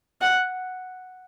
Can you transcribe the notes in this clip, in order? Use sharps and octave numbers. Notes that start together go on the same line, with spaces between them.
F#5